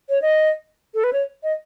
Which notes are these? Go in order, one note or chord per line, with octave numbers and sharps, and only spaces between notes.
C#5
D#5
A4
B4
C#5
D#5